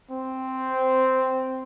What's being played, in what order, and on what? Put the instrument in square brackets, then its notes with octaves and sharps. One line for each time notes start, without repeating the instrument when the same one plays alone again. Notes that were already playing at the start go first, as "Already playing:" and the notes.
[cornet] C4